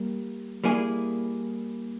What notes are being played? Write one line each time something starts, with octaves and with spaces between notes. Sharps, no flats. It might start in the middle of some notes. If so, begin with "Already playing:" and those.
Already playing: G3 A#3
G3 A#3 E4 G#4